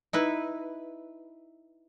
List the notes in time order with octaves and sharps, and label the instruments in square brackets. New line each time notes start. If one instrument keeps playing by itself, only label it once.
[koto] D#4 E4 B4